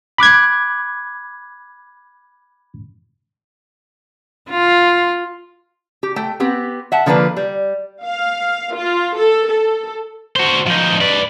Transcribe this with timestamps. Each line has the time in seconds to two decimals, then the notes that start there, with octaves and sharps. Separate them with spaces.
0.18 B5 D6 F#6 G#6
4.50 F4
6.03 G4
6.16 A3 G5
6.40 B3 C4 G4
6.92 E5 F#5 A5
7.06 D3 F3 A#3 D4 B4
7.36 G3
8.04 F5
8.75 F4
9.17 A4
9.49 A4
10.36 F#4 C5
10.67 F3 D#4
11.01 B4 D5